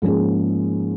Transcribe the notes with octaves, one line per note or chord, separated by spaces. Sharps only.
G#2 F3 A#3 C#4 G#4